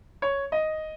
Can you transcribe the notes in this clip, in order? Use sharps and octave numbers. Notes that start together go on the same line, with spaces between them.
C#5
D#5